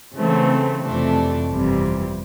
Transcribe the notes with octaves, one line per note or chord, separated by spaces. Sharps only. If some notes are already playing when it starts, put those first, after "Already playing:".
C#3 E3 A3 C4
F2 C3 E3 A3 D4
G1 F2 C3 E3 G3